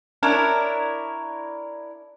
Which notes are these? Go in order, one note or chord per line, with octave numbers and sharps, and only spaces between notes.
D4 E4 A#4 C#5